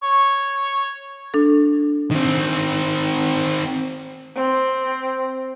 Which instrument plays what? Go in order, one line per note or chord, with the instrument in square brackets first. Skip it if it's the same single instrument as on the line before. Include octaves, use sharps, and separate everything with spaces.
[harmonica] C#5 C#6
[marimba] D4 A4
[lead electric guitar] D#3 C4
[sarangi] C4